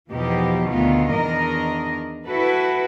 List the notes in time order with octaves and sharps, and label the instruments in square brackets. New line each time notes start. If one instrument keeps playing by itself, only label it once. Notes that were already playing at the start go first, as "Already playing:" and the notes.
[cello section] E2 B2 F3 D#4 G4
D2 D#3 B3 F4
E2 D#3 D4 A#4 D#5
E4 F#4 A4 B4